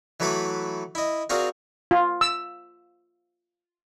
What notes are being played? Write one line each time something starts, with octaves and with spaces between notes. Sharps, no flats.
E3 F#3 A3 B4 B5 D6
E4 D#5
C4 F4 F#4 G#4 A#4 D5
F4
E6